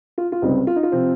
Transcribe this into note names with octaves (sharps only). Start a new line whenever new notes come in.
F4
F4
C#2 C3 G3 C4 D#4
F4
D#4
F4
C3 F3 C4